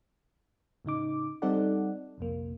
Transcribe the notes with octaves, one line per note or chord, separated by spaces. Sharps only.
A2 C#3 D#4 D6
G3 C4 D#4 A4 D5 F#5
A#1 F2 C3 A#3